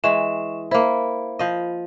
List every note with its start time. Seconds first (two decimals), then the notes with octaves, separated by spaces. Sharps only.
0.04 E3 G#3 D#5 C#6 E7
0.71 A#3 E4 C5 B5
1.39 F3 D#5